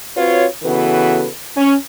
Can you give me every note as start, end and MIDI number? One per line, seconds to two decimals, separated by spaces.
0.16 0.45 60
0.16 0.45 65
0.16 0.45 66
0.16 0.45 71
0.16 0.45 73
0.63 1.27 49
0.63 1.27 52
0.63 1.27 59
0.63 1.27 66
0.63 1.27 69
0.63 1.27 71
1.56 1.74 61